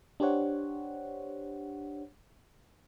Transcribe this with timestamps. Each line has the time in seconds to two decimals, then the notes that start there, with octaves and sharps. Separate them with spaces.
0.20 D4 G4 C5 C#5 F#5